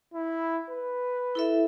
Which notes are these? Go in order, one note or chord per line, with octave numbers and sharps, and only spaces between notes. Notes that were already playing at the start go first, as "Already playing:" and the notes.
E4
B4
E4 A4 E5